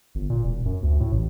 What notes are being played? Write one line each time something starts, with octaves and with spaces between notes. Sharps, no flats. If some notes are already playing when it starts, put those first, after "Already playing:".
G1
A#2
E1
F#2
D2
A2
A1